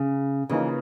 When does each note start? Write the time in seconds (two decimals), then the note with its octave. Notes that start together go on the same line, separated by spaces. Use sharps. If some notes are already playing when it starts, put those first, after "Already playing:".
Already playing: C#3
0.49 C#3 E3 F3 A#3 D#4